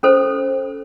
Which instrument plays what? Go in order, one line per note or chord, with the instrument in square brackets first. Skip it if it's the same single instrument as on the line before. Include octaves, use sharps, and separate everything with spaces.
[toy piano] C#4 A4 C5